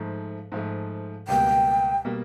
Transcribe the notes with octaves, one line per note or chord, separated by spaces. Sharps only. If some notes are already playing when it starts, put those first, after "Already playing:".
Already playing: G#2 F3 A3
G#2 F3 A3
C#2 B2 G3 A#3 G5
B2 G3 A#3